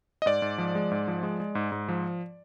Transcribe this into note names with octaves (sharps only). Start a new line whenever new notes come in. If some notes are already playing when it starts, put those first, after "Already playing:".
D#5
G#2 D5
G#2
F3
G#3
G#2
F3
G#3
G#3
G#2
G#2
F3